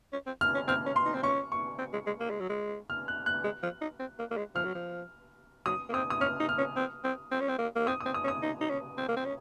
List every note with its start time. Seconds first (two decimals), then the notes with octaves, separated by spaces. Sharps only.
0.13 C#4
0.26 C4
0.41 F6
0.55 C#4
0.68 C4 F6
0.86 C#4
0.96 C6
1.06 D#4
1.14 C4
1.23 C#4 C#6
1.52 C#6
1.79 C4
1.93 G#3
2.07 G#3
2.20 A#3
2.30 G#3
2.40 F#3
2.50 G#3
2.90 F6
3.08 F#6
3.26 F#6
3.44 G#3
3.63 F3
3.81 D#4
4.00 C4
4.19 A#3
4.31 A#3
4.37 G#3
4.55 F3 F6
4.65 F#3
4.75 F3
5.66 F#3 D#6
5.89 A#3
5.93 C4 D#6
6.10 D#6
6.21 C#4 F6
6.40 D#4
6.49 F6
6.58 C#4
6.76 C4
7.04 C4
7.31 C4
7.40 C#4
7.49 C4
7.59 A#3
7.76 A#3
7.87 C4 D#6
8.00 D#6
8.06 C4
8.14 D#6
8.24 C#4
8.28 D#6
8.43 D#4
8.61 D#4
8.70 C#4
8.98 C4
9.09 A#3
9.17 C4
9.25 C#4